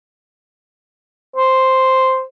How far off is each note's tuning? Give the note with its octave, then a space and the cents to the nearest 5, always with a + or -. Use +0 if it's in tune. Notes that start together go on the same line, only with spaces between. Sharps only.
C5 +0